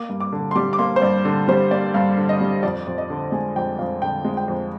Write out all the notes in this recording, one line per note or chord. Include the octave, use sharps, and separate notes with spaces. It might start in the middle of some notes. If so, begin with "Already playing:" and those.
Already playing: A#3 D6
G2
D6
D3
C6
G3 D6
D6
A#3 C6
C5
G2 D5
D3
G3 C5
A#3 D5
G2 F5
D3
D#5
G3
F2 D5
F2
D#5
D3
G#3 G#5
F2 G5
F2 F5
D3 G5
G#3
G5
F2